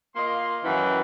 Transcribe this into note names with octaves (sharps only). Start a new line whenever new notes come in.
A#3 F4 D#5 C6
F#2 D#3 E3